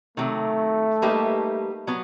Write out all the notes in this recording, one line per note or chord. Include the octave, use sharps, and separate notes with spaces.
C3 D#3 F#3 A3
G3 A#3 D#4 G4 B4
F#3 B3